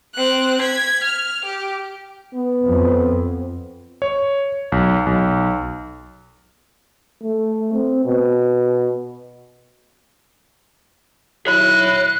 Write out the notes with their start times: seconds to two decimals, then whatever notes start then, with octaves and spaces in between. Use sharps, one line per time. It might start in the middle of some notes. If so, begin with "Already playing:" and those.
0.14 C4 F#6
0.61 G#6 B6
1.04 F6
1.45 G4
2.35 B3
2.66 F2
4.02 C#5
4.72 B1
5.07 B1
7.22 A3
7.73 C4
8.05 B2
11.47 D#3 F#3 E4 C#5 B5 F#6